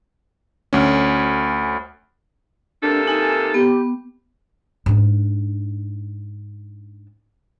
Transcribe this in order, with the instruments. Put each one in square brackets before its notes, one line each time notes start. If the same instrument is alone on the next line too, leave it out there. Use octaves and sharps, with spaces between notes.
[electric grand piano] D2 C#4
[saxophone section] C3 A#3 A4 [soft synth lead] D4
[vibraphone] D#4 [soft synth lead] G#5
[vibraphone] B3 [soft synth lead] G4
[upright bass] G#2 D4